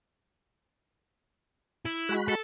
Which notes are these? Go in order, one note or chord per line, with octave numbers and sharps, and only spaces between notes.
E4
G#3 F#4 B5
A4